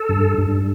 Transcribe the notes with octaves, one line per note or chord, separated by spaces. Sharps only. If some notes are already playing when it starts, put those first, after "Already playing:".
Already playing: A4
G2
G2